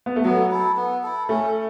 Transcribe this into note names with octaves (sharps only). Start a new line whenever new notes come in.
B3
A3
F#3 B3
E4 A4
B3
E4 A4
A3 C#4